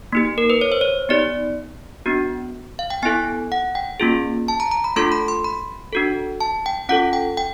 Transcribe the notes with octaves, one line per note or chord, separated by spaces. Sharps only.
A#3 D#4 G4
A#4
B4
C#5
C5
C#5
B3 D#4 G4 D5
B3 D4 F#4
F5
G5
B3 E4 A4 G#5
F#5
G5
A#3 C#4 F4 G#4
A5
A#5
A#5
B5
A3 D4 F4 A4 C6
B5
C6
B5
D4 F#4 A4
A5
G5
C#4 F4 A4 F#5
G5
G5